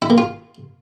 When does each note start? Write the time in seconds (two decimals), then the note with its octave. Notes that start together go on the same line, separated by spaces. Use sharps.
0.02 E4
0.10 A#3
0.18 F4